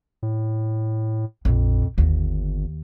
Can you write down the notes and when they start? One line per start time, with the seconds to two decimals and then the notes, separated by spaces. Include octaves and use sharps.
0.23 A2
1.45 A#1 F2
1.98 G1 D#2 A#3